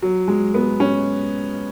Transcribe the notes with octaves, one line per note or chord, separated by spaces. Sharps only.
F#3
G#3
B3
C#4